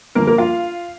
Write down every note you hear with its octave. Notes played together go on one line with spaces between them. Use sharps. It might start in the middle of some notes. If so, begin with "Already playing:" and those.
G1 G2 F3 A#3 A#4
A#3 A#4
F4 F5